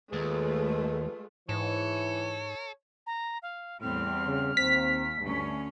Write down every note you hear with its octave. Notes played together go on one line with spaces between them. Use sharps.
D#2 G#3 A3 F4 B4
G#2 E3 A4 C#5
A#5
F5
E2 A2 G3 C4 F6
C#3
D#2 C4 B6
D2 G2 C#4